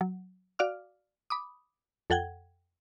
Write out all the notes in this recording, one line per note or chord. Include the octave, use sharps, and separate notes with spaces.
F#3
F#4 D5 F5 D6 F6
B5 D6 D#6
F2 A4 F#5 G5 G#6